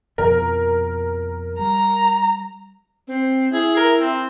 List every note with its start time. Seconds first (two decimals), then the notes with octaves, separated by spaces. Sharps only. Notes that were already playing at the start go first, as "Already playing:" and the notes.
0.18 F2 B2 F3 A#4
1.59 G3 A#5
3.08 C4
3.52 E4 G#4
3.77 A#4
3.98 C4